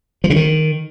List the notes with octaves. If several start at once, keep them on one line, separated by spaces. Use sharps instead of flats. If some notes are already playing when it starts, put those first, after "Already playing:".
F3
C#3
D#3